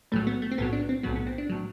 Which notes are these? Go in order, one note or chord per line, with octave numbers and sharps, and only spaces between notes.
B1 A2 F#3 A3
B3
A3
C4
B1 A2 F#3 B3
D4
C4
B1 A2 F#3 B3
B3
C4
D4
A2 F#3